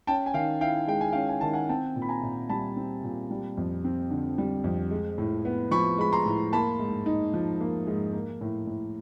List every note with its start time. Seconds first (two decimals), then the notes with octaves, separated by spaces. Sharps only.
0.07 C#4 G5 A5
0.26 G#5
0.34 D#3 F5 G5
0.61 E4 F5 G5
0.88 G#3 G5
1.01 G#5
1.12 C#4 F5 G5
1.29 G#5
1.41 D#3 A5
1.53 F#5 G#5
1.69 C4 G5 A5
1.96 A#2
2.02 B5
2.09 G#5 A#5
2.23 A#2
2.49 G3 A5 B5
2.77 C4
3.04 A#2
3.31 G3
3.57 F2
3.84 C4
4.10 D3
4.38 G3
4.64 F2
4.91 G#3
5.18 A2
5.45 B3
5.71 F3 B5 C#6
5.98 G#3 B5
6.13 A#5 C6
6.25 A2
6.53 A#3 A5 B5
6.79 G#2
7.06 D#4
7.34 F3
7.60 A#3
7.87 G#2
8.13 A#3
8.41 A2
8.67 A2